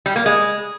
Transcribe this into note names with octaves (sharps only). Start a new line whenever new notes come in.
G3
A#3
G#3